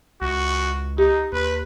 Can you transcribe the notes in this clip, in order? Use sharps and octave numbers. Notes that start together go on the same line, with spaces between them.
C#2 F#4
D#4 G4
D#2 B4